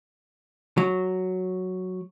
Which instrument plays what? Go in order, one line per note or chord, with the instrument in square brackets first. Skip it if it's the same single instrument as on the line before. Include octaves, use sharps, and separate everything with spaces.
[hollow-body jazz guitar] F#3